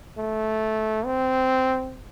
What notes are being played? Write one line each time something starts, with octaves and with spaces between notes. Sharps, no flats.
A3
C4